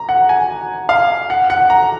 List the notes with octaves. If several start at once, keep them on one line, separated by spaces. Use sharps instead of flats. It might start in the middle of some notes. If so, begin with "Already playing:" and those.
Already playing: A#5
F#5
G#5
F5
F#5
F#5
A#5